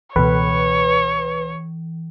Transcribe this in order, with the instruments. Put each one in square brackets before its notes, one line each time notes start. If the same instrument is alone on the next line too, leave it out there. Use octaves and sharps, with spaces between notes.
[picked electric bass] C#2 B2 [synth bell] E3 [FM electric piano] B4 [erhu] C#5